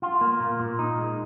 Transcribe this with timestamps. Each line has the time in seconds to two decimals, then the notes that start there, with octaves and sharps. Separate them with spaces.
0.02 F4
0.21 A#3
0.40 A#2
0.60 A#2
0.79 D#4
0.98 G#3